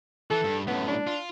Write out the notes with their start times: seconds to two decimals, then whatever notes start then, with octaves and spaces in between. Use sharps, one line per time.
0.31 E3 A4
0.44 G2
0.67 F#2 A2 B3
0.88 D4
1.07 F4